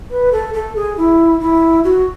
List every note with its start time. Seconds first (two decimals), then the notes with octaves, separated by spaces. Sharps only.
0.10 B4
0.32 A4
0.54 A4
0.76 G#4
0.97 E4
1.40 E4
1.84 F#4